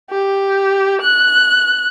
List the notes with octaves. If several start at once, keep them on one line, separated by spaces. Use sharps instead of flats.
G4
F#6